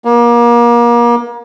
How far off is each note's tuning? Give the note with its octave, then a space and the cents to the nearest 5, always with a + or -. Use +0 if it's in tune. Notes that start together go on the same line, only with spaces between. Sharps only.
A#3 +30